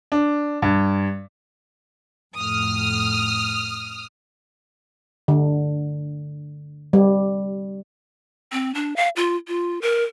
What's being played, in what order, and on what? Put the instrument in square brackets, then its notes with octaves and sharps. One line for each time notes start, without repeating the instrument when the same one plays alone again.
[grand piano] D4
G2
[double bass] F2 A2 [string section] D#6 F6
[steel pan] D3
G3
[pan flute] C4
D4
F5
F4
F4
A#4